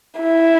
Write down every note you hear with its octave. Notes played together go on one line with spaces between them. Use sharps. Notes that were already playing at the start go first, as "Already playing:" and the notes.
E4